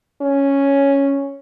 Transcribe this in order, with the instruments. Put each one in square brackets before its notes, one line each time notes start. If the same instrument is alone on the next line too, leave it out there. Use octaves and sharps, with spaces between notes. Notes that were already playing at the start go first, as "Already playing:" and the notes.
[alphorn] C#4